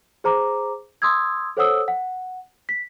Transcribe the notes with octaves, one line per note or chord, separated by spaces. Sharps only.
G#4 C5 A#5 D6
C6 D#6 E6 G#6
A4 C5 C#5 F#5 D#6 E6
F#5
B6